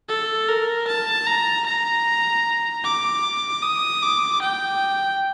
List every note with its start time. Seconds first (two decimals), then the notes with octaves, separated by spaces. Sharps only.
0.09 A4
0.48 A#4
0.88 A5
1.27 A#5
1.66 A#5
2.84 D6
3.63 D#6
4.02 D6
4.42 G5